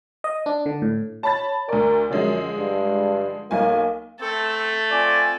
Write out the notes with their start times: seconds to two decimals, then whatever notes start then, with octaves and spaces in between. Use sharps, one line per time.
0.24 D#5
0.46 D4
0.66 D3
0.82 A2
1.23 C#5 A5 B5 A6
1.69 D2 A#4 D5
2.10 F#2 D3 F3 G#3
2.59 G2
3.51 B1 A#3 G#5
4.20 A3 C4 A4
4.91 C4 F4 D5 G#5